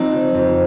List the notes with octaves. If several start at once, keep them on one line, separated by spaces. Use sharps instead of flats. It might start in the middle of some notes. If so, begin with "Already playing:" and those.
Already playing: F3 C4 D#4
C#3
F2